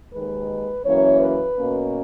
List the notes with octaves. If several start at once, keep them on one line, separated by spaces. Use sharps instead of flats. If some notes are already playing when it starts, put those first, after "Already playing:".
D#2 D#3 G#3 B4
F#2 E3 A#3 C#4 C#5
B4
B2 A#3 C#4